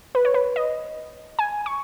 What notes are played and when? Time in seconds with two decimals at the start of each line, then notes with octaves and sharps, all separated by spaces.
0.15 B4
0.25 C#5
0.34 B4
0.56 D#5
1.39 G#5
1.66 C#6